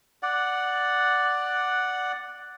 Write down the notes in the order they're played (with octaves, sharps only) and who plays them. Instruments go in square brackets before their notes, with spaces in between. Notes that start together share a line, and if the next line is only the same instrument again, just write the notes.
[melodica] D5 F#5